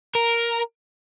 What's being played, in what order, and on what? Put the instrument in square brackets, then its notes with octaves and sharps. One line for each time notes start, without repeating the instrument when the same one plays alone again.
[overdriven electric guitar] A#4